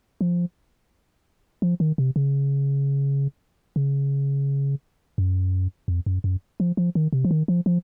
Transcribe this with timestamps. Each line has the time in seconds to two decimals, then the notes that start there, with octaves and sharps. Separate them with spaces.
0.21 F3
1.62 F3
1.80 D#3
1.98 C3
2.16 C#3
3.76 C#3
5.18 F#2
5.88 F2
6.06 F#2
6.24 F#2
6.60 F3
6.77 F3
6.95 D#3
7.13 C3
7.25 F3
7.31 D#3
7.48 F3
7.66 F3